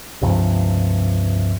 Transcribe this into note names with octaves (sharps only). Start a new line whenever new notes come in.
C#2 G2 C3 F3